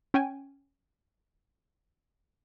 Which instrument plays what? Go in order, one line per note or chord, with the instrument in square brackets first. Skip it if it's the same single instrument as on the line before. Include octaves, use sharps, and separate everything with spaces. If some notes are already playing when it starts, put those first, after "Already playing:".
[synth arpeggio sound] C#4 G5 G#5